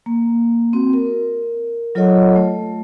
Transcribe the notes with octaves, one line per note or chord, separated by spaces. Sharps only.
A#3
C4 F#4
A#4
F#3 F4 A4 C#5 D#5 F#5
A3